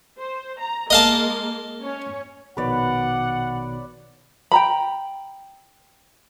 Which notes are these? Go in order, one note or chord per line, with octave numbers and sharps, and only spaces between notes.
C5
A#5
G#3 A#3 A#4 D#5 F5 A5
C#4 C#5
A#1 B2 D#3 B4 C#5 D5 F#5
G5 A#5 B5